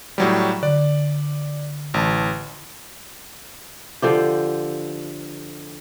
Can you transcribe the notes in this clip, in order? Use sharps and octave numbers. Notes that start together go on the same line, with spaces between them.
A2 F#3 G3
D3 D5
A1 A5
D3 F3 G4